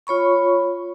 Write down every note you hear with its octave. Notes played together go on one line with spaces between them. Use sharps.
F4 C#5 B5 C#6